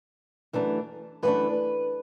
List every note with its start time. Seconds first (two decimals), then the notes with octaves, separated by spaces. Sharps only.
0.53 F#2 E3 A3 D4
1.23 F#2 E3 A3 D4 B4